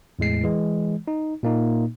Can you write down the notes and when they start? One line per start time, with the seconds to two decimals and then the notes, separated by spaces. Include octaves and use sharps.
0.19 E2 A2 G#3 C7
0.43 E3 G#3
1.08 D#4
1.43 A#2 A#3 D#4